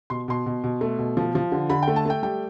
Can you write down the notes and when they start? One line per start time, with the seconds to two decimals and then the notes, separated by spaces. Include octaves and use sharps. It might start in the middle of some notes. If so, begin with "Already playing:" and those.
0.10 B2 C6
0.28 B2 C6
0.46 B2
0.64 B2
0.81 A3
0.98 B2
1.17 F3
1.35 F3
1.52 D3
1.70 D3 B5
1.82 G5
1.88 A3
1.96 A5
2.06 A3 G5
2.23 G3 G5